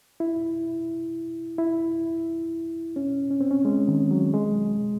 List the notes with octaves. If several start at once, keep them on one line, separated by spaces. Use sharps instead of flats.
E4
E4
C#4
C#4
C4
C#4
G#3
D#3
F#3
G#3